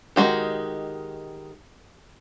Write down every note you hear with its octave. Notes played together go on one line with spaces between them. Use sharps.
D#3 G#3 F#4 G4